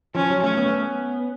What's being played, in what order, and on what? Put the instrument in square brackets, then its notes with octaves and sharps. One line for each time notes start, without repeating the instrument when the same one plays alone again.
[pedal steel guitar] F3 [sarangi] C#4
[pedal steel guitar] F#3
[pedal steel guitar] A3 [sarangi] C#4
[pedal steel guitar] B3
A3
B3